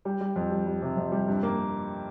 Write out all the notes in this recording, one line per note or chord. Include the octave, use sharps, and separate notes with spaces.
G3
G3
F2
G3
G3
C3
F2
G3
G2
A#3